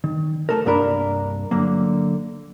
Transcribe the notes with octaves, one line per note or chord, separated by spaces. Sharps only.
D#3
A3 A4 A#4
C2 G2 A#3 D4 A#4 B5
D3 F#3 A#3